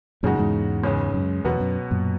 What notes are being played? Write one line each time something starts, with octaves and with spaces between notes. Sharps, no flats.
F#2 A#2 C#3 G#3 D#4 F#4
E2 G#2
C#2 C#3 G#3 C#4
F#2
E2 B2 F#3 B3 F#4 B4
F#2
F#2 A#2